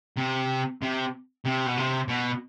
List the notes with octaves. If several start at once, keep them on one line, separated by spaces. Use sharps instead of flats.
C3
C3
C3
B2
C3
B2